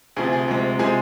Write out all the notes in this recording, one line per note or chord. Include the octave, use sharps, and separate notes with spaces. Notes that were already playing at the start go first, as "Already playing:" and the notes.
D2 C3 F3 G#4
G#4
D2 C3 F3 G#3
C3 F3 G#3 G#4